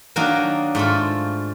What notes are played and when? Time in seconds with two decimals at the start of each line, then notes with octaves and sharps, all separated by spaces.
0.16 D#3 F#3 A#3 D4 D#4 F#4
0.75 G#2 A3 F4 A4